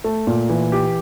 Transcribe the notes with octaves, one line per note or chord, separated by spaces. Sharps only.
A3
A#2
E3
G4